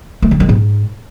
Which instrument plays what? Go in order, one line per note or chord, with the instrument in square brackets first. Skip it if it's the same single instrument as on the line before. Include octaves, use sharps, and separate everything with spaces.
[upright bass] A3
D3
D#3
G#2